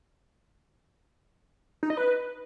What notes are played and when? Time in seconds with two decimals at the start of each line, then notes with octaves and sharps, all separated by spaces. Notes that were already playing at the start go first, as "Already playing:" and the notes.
1.83 D#4
1.90 D#5
1.97 B4